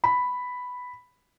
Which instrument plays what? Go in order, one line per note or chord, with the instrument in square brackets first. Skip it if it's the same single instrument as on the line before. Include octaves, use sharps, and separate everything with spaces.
[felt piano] B5